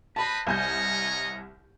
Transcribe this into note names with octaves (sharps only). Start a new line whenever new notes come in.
B4 C5 D#5 A5 B5
C2 C#5 D#5 G#5 A#5 G6